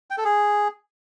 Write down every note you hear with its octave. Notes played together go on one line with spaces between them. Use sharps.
G5
A4
G#4